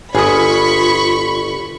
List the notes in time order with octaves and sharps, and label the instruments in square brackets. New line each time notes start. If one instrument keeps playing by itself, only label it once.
[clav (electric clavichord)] G1 [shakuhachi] F4 [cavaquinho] G#4 D#6 [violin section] B5 C#6